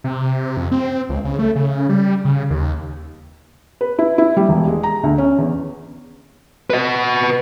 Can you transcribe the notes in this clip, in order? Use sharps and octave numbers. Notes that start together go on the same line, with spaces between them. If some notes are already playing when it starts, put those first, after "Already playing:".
C3
F2
C4
C#2
C#3
A3
C#3
G3
C#3
D#2
B4
E4
E4
G3
E1
G#3
A#5
D2
C#4
E2
B4 D#5